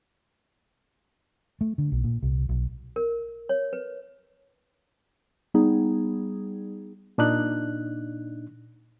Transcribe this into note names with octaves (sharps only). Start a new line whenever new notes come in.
A3
D3
B1
A#2
C2
B1
A#4
C#5
B4
G3 B3 D#4 G#4
A#2 D4 D#4 F#6